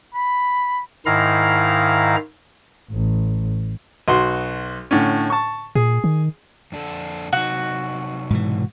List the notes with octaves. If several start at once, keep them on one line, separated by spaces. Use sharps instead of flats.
B5
G#2 D#3 E4 F5 A#5
A1
B1 F#4 C6
A2 D3 C#4
A5 C#6
A#2 G#4
D#3
F2 D4 A4
C3 F#3 D#4 F#4
G#2 B2 E3